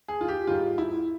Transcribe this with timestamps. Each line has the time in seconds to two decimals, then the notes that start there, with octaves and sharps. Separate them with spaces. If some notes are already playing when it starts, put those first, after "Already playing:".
0.08 G#4
0.21 F4
0.28 G4
0.47 G#2 G3 F4
0.78 E4